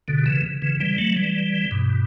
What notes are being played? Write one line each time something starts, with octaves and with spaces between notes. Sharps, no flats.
B2 D3
C#3 E3
C#3 E3
E3 G3
F#3 A3
E3 G3
G2 B2